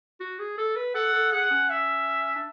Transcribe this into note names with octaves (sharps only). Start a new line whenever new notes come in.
F#4
G#4
A4
B4
A4 F#5
A4
G#4 F#5
C#4
E5
D4